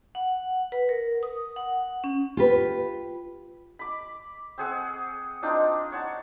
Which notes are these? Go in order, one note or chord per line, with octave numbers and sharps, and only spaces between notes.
F#5
B4
A#4
D#6
F#5
C#4
F4 G4 B4
B5 D6
C4 G#4 F#5 E6
C4 D4 D#4 F4
C#5 F#5 A5